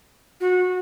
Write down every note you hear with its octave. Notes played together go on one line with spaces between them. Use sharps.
F#4